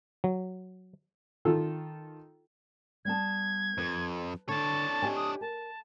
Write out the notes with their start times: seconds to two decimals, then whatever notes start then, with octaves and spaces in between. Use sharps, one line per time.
0.24 F#3
1.45 D#3 F4 A4
3.05 G3 B3 A5 G#6
3.78 F2 B4
4.49 D3 D4 C#5 A5
5.02 G4 D#5 G#5
5.16 D#6
5.41 A#4 A5